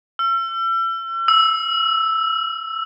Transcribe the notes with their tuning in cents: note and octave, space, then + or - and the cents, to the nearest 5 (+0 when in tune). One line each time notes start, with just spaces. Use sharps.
E6 +40
E6 -5